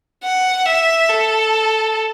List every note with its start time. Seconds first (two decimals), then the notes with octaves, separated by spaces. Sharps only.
0.23 F#5
0.65 E5
1.09 A4